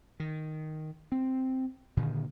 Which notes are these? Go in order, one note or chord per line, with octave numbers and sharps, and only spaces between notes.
D#3
C4
A#2 D3 D#3